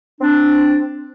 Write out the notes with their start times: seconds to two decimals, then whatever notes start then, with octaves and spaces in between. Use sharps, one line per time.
0.21 C4 D4